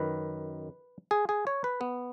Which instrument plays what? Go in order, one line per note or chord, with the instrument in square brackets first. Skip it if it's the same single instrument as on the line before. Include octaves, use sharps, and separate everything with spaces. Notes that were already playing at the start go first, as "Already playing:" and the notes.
Already playing: [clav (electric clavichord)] F#2 D#3 B4
G#4
G#4
C#5
B4
B3